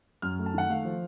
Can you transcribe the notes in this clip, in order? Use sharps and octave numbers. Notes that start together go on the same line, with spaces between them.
F#2 F6
A3
A5
D#3 F#5
A3 F5
F3